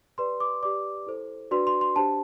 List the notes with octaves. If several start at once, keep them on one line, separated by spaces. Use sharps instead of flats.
G4 B4 D5 C6
D6
G4 B4 D5 D6
E4 A4 C5
D4 F#4 B4 D5 C6
C6
C6
D4 G4 C5 A5